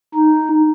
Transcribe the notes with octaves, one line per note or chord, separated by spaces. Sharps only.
D#4